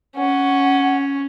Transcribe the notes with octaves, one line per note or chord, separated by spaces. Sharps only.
C#4 F#5